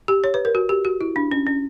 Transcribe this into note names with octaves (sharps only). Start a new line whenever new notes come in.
G4
C#5
B4
A#4
F#4
G4
F#4
E4
D4
C#4
C#4